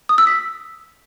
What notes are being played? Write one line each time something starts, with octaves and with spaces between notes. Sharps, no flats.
D#6
E6
B6